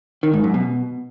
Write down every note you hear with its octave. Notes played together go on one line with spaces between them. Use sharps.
D#3
G#2
F#2
B2